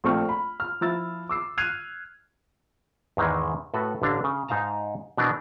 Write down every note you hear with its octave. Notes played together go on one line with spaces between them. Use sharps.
A#1 A3 C4 C#6 F6
B5
F6
F3 E4 E6 A6
D6 E6 C7
F6 F#6 G#6 C7 D#7 F7
E2 G#2 D#3 E3 G#3
A2 F#4 A4 B4
A1 D3 D4 F5 A#5
C#3
G#2 D#4 F5 A5 A#5
B2 E3 B3 C4 D4 A#4